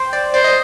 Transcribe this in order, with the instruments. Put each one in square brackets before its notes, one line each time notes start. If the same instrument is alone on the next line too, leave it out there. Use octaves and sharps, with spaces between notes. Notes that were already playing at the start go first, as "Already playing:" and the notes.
Already playing: [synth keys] C5 G5
D5
[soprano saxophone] C5 [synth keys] D5
[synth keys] D#5